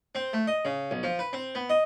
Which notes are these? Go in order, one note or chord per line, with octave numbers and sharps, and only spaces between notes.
C4
A3
D#5
C#3
B1
F3
B4
C4
B3
D#5